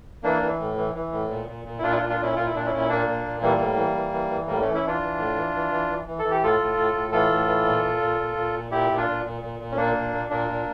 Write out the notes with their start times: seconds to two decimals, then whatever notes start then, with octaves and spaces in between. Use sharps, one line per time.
0.23 E3 A#3 D4
0.41 E3
0.59 A2
0.77 E3
0.95 E3
1.12 A2
1.30 A#2
1.47 A#2
1.65 A#2
1.78 E4
1.82 A#2 D4 F4
1.91 E4
1.96 A#2 D4 F4
2.09 D4 F4
2.18 A#2 C#4 E4
2.36 A#2 F4
2.46 E4
2.53 A#2 D4
2.66 C#4 E4
2.71 A#2
2.78 E4
2.89 A#2 A#3 D4
3.06 A#2
3.24 A#2
3.41 E3 G3 A#3
3.60 A2
3.77 E3
3.95 E3
4.12 E3
4.30 E3
4.47 A2 G3 A#3
4.61 E3 A3 C#4
4.74 C#4 E4
4.83 E3 D4 F4
5.01 E3
5.18 A2
5.36 E3
5.54 E3
5.71 E3
5.89 E3
6.06 E3
6.19 E3 A4
6.31 G4
6.41 A2 F4 A4
6.60 A2
6.77 A2
6.95 A2
7.12 E3 F4 A4
7.30 A2
7.47 E3
7.65 A#2
7.83 A#2
8.01 A#2
8.18 A#2
8.36 A#2
8.54 A#2
8.71 A#2 E4 G4
8.90 A#2
8.97 D4 F4
9.07 A#2
9.24 A#2
9.41 A#2
9.59 A#2
9.72 C#4
9.77 A#2 A#3 D4
9.95 A#2
10.13 A#2
10.30 A#2 A#3 D4
10.48 A#2